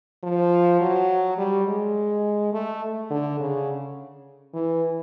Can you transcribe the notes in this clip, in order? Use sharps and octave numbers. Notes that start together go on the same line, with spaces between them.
F3
F#3
G3
G#3
A3
D3
C#3
E3